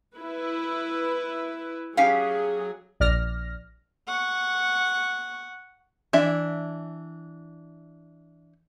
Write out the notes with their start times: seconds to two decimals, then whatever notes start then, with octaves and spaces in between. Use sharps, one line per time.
0.16 E4 B4
1.97 F#3 C#4 G4 G#4 F5
3.00 A#1 D5 F6 A#6
4.07 F#5 C#6
6.13 E3 D4 E5